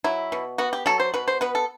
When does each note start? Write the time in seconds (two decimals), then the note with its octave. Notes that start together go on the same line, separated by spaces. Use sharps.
0.04 F#3 E4
0.32 B2
0.58 B3 F#4
0.73 G4
0.86 F#3 A4
1.00 C5
1.14 B2 B4
1.28 C5
1.41 B3 B4
1.55 A4